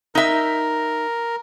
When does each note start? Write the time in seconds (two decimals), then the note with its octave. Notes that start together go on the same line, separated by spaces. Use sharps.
0.15 D#4 A#4 E5